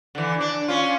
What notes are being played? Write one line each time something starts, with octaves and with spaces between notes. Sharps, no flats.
D3 E3
D4
C#4 F4